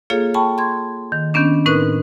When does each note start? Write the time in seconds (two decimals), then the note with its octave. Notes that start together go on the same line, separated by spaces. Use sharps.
0.10 A#3 F4 G#4 A4 C#5 F5
0.34 G5 A5 B5 C#6
0.58 C6 G#6
1.12 D#3
1.34 D#3 B3 C#4 D4
1.66 A2 C4 D#4 A#4 B4 F#6